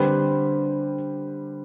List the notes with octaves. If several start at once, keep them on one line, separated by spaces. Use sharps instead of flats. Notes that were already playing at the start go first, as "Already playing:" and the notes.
Already playing: D3 G3 C4 G4 B4